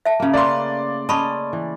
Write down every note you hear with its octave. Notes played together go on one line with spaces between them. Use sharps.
E5 A5
C#3 A#3
A3 A#3 B4 D5 C6
C#4 D#5 A5 B5 C#6
E3